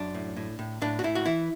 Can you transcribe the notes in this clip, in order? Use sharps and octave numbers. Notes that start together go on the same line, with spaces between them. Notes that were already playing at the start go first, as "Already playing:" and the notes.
Already playing: F#2 D4
A2
A2
A2
A2 D4
F#4
A2 E4
F#4
E3 E4